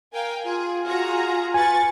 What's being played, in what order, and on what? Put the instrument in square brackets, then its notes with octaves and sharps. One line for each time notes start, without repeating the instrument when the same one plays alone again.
[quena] A#4 [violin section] F5 G5 G#5
[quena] F4 [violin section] G#4
[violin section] F#4 G#4 A#5
[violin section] B4 C#6 A6 [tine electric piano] G#5